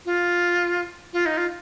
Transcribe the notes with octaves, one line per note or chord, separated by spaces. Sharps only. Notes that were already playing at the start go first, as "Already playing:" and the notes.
F4
F4
D#4
F4